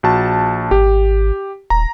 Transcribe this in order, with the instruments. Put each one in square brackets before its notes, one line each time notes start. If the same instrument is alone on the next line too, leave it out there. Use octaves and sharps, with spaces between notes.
[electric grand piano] A#1 F#4 A5
[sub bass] G#1 [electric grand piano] G4
[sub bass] D#1 [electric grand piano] A#5